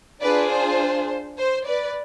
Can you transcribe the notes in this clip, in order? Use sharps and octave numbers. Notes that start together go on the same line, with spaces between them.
D4 F4 G#4 B4 D5
C5
C5
B4 D5